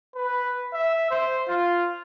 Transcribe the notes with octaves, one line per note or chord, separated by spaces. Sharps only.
B4
E5
C5
F4